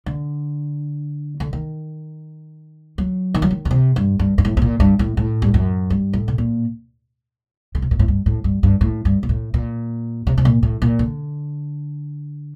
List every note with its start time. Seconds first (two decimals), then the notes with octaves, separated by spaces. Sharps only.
0.06 D3
1.40 D3
1.53 D#3
2.98 F#3
3.34 D#3
3.42 F#3
3.51 D#3
3.65 D3
3.71 C3
3.96 G2
4.19 G2
4.38 G2
4.45 A2
4.57 A2
4.62 A#2
4.80 G2
4.99 A2
5.17 A2
5.42 G2
5.54 F#2
5.90 G2
6.13 A2
6.28 C3
6.38 A#2
7.75 D3
7.82 C3
7.91 A#2
7.99 A2
8.08 G2
8.26 A2
8.44 G2
8.63 G2
8.81 A2
9.05 G2
9.23 A#2
9.29 A2
9.54 A#2
10.27 C3
10.38 C3
10.45 A#2
10.63 A2
10.82 A#2
10.99 D3